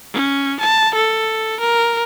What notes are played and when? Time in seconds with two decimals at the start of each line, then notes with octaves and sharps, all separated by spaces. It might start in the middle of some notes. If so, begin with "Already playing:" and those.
0.14 C#4
0.60 A5
0.94 A4
1.60 A#4